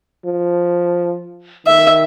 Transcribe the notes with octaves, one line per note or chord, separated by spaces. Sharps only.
F3
D#3 E5